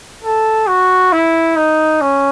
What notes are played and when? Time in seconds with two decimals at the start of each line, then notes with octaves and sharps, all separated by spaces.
0.24 A4
0.68 F#4
1.13 E4
1.56 D#4
2.01 C#4